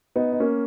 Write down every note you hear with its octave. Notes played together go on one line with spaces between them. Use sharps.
B3 D#4
D#4
A#3 C#4